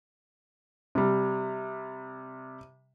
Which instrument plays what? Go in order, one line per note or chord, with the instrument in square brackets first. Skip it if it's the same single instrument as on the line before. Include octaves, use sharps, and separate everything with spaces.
[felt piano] C3 G3